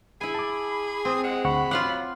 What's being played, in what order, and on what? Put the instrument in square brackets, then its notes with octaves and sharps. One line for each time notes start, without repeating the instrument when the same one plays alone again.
[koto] E4 G#5 [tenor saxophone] G#4 [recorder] B5
[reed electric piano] A5 D6
[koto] C4 [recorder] D#6
[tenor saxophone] G#3 [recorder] F#5
[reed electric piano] D2 F#5 C#6 [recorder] B5
[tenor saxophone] F#3 [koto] F4 F5 F#5 [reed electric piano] D6